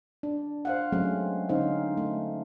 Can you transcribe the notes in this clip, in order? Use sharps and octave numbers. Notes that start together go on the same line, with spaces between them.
D4
C5 F5 F#5
F#3 G#3 A3 C4 C#4
D3 C#4 D#4 C5 F5
A3